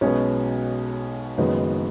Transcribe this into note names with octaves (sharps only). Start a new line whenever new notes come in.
B1 B2 G#3 B3 C#4
F#1 F#2 D#3 G#3 B3